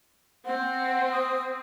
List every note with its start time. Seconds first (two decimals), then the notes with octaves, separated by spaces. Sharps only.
0.45 C4 F#5
1.12 D#6